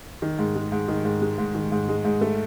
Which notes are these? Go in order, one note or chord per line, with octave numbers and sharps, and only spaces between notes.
D#3
G#2
G#3
G#2
D#3
G#2
G#3
G#2
D#3
G#2
G#3
G#2
A3